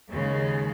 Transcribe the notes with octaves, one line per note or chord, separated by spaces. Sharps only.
D#2 C#3 G#3